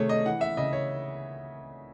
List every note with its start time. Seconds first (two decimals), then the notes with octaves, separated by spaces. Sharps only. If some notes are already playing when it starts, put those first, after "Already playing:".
Already playing: C3 D#3 A3 G#4 C#5
0.09 D#5
0.26 E3 F#5
0.41 E5
0.57 C#3 D#5
0.73 C#5